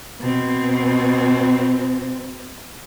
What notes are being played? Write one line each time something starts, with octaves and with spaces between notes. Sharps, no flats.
B2 C4